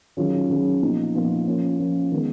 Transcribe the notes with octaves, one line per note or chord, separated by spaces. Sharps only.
D#3 F#3 C#4 F4 G#4
D#3 F#3 C#4 F4 G#4
A#2 F3 B3 D#4
A#2 F3 B3 D#4
F3 A#3 C#4
F3 A#3 C#4
D#3 G#3 B3